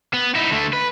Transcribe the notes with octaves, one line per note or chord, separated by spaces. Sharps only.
B3
D#4 E4
D3 A3
B4